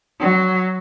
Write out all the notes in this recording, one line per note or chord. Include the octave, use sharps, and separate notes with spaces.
F#3